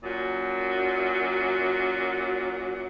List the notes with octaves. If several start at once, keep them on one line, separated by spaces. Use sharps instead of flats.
F#2 A#2 F#3